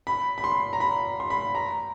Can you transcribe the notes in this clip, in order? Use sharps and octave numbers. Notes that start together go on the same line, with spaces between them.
B5
B5
C6
A#5
B5
C6
B5
A#5